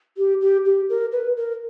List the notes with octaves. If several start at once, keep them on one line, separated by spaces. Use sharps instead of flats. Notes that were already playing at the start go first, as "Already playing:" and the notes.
G4
G4
G4
A#4
B4
A#4